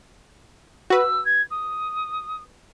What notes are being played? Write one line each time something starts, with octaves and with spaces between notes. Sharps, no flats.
F#4 B4 E6
G#6
D#6